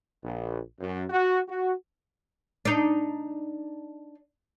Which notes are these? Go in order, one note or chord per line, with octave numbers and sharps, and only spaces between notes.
A#1
F#2
F#4
F#4
D4 D#4